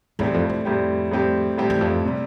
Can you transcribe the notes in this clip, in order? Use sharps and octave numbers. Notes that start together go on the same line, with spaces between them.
E2 A2 G3 C4 G4
F2
F2
A2 G3 C4 G4
A2 G3 C4 G4
A2 G3 C4 G4
E2
F2
C3 G3